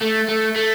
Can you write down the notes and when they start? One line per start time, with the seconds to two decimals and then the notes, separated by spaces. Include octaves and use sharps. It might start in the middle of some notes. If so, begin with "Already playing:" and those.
0.02 A3
0.29 A3
0.56 A3